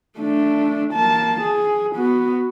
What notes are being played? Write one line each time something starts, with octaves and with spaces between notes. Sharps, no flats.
A3 D4
A#3 A5
G#4
B3 F#4